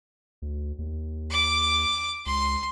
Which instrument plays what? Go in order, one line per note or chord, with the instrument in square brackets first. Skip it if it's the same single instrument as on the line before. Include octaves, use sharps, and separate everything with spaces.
[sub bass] D2
D#2
[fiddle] D6
[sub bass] C#2 [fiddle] C6